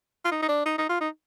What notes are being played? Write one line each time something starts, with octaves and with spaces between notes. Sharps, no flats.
F4
D#4
D#4
D4
D#4
D#4
F4
D#4